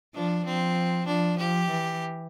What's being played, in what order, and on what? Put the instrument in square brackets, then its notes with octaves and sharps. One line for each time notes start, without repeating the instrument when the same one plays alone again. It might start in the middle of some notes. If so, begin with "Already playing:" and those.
[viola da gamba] F3 [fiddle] D4
[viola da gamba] F3 [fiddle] C4
[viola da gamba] F3 [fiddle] D4
[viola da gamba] F3 [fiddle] G4
[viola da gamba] E3